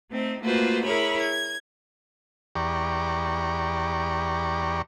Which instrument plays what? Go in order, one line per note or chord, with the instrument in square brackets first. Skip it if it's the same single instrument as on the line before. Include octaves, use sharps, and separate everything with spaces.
[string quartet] A3 C4 D#4
A3 A#3 F4 F#4 B4 C5
E4 G#4 A#4 C#5 B5
G#6
[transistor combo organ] E2 G4 D5 A#5 C#6